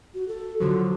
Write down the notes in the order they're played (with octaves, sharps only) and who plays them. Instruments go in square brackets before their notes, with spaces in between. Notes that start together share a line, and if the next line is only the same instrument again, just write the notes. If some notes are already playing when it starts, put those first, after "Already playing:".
[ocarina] F#4
A4
[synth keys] D3 F3 F#3 [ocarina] F#4